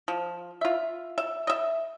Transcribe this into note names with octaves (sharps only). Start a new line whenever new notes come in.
F3
F4 E5
E5
D#5 E5